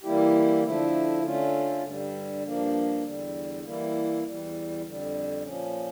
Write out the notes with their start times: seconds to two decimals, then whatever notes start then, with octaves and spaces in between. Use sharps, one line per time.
0.03 E3 G3 A#3 E4 G4
0.64 D3 F3 A3 E4
1.23 D3 A3 C#4 F4
1.83 G2 D3 G3
2.44 G2 F3 A#3 D4
3.03 E2 D3 G3
3.63 E3 G3 A#3 E4
4.23 E2 E3 G3
4.83 F2 D3 G3
5.43 A#2 F3 C#4